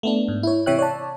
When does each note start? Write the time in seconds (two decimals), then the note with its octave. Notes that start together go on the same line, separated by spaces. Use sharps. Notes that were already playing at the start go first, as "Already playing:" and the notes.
0.03 A3 B3 D4
0.28 G#2
0.43 E4 C#5
0.66 C3 E3 C#5 E5 G5 F#6
0.79 C#5 D5 A5